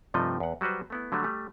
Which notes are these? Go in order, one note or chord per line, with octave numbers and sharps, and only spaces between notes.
G2 C3 F3 A3 D#4 D#5
E2 F#5
F#3 G3 F#4 B4 C5
A3 B3 E4
D3 F#3 G3 A3
G3 A3